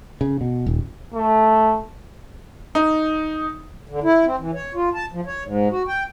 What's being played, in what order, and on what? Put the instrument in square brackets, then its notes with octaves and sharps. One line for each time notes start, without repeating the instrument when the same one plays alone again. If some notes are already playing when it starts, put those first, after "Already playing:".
[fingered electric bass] C#3
B2
D#1
[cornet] A3
[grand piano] D#4
[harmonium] D3
E4
C4
E3
C#5
F4
A5
F3
C#5
G#2
F#4
G5